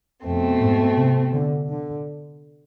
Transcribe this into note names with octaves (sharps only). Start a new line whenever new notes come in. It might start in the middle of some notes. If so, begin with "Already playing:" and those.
F2 B2 A3 C4
G#2
C3
D3
D3